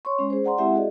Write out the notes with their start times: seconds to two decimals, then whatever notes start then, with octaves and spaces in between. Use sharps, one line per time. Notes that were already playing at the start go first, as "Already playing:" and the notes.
0.05 C#5 C6 C#6
0.19 G#3 C#4
0.30 G#4 C5
0.44 D5 F#5 A#5 C6
0.58 G#3 C4 E4 G4 E5 F#5
0.75 F#4 G#4 D5 D#5